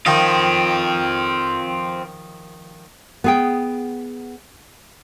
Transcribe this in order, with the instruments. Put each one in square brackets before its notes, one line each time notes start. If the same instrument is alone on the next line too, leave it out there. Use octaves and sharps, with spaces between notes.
[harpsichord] D#3 F3 D#4 [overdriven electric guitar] C4 F4
[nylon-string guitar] B3 G#4 G5